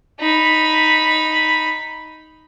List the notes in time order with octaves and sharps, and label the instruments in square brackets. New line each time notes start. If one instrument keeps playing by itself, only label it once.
[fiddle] D#4 B5